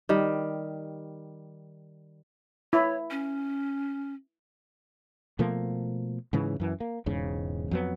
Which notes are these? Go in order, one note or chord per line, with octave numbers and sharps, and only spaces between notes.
D#3 G3
E4 C#5
C#4
B2 F3 A3 A#3
G#2 C#3 E3
F#2 E3
A#3
E1 E2 G#2 C#3
F2 F#3 B3